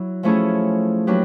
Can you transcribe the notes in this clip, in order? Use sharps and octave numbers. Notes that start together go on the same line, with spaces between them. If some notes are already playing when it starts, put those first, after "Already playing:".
Already playing: F#3 E4
F3 A3 C#4 E4 G#4
F#3 A#3 D4 G4 B4